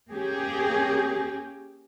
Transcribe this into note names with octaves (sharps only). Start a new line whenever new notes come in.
A#3 C#4 G4 G#4